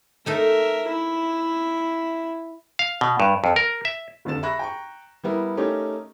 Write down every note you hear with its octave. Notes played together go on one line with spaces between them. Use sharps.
A3 D#4 A4 A#4 E5
E4 E5
F5
B2
G2
F2
A#4
E5
F1 F2 D3 A6 E7
E5 B5 C#6 F#6 A#6
G5 A#5 C#6
G3 B3 E4 A#4
A3 C#4 D#4 G4 A#4